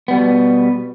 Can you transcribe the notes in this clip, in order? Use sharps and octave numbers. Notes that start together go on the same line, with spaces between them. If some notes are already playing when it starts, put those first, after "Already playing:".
B2 G3 B3